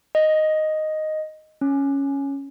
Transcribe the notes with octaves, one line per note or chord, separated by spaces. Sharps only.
D#5
C#4